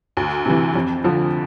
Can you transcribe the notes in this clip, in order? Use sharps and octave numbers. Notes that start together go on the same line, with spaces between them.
D2
C3 E3
F2
D3 F3